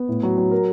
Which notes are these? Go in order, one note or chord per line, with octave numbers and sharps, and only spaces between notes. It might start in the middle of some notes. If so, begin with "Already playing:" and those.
Already playing: B3
A2
F#3
F#3
A#4